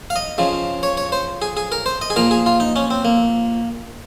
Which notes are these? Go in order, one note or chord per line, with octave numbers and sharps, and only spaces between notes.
F5
D#5
C#3 F3
C#5
C#5
C5
G#4
G#4
A#4
C5
D#5
G#4
A#2 F3 A#4
G#4
F4
D#4
C#4
C4
A#3